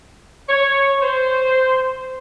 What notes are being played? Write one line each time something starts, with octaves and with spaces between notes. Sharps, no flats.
C#5
C5